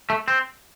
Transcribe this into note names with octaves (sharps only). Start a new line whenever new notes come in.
A3
C4